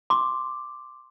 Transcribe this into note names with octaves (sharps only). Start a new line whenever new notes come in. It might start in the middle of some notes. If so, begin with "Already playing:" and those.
C6 D6